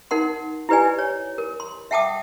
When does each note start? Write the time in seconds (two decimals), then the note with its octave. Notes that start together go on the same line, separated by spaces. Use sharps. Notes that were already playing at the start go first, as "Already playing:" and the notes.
0.11 D#4 A#4 F#5 C6
0.69 E4 G4 B4 D5 G#5
0.99 C#5
1.38 A#4
1.60 C6
1.91 E5 F#5 G5 A5 D6 D#6